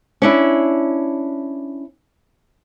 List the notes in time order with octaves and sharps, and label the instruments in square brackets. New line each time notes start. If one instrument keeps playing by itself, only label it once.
[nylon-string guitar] C#4 D4 E4